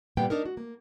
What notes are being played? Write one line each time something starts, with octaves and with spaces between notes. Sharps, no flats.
A#2 G3 A#3 B3 G5
D4 D#4 A#4
F#4
A#3